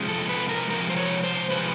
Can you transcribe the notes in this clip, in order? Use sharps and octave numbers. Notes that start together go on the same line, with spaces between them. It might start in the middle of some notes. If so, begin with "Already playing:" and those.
Already playing: C3 F3 G#3
A4
B4
A#4
C3 F3 G#3 A#4
C5
C#5
C5
C3 F3 G#3 B4